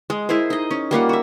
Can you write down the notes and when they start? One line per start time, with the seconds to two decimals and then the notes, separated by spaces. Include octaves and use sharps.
0.10 G#3
0.29 E4 G#4 A#4 C5
0.50 D#4 D#5
0.71 C#4
0.91 G3 A#3 F4 F#5
1.09 F#4 E5